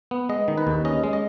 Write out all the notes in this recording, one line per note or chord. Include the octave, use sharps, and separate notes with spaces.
B3
G#3 D#5
D#3
B4
D#2
C#4 D#5
G#3
D#5